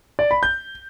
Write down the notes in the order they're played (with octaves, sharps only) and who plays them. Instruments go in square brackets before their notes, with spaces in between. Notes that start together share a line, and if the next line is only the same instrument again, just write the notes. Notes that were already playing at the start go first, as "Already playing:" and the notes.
[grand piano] D5
B5
G6